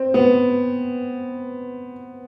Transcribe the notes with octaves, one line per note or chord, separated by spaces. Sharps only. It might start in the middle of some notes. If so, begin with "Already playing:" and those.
Already playing: C4
B3